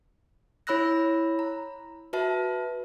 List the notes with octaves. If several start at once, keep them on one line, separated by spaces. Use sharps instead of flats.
E4 C#5 B5 E6 F#6 A#6
A#5
F#4 B4 E5 A5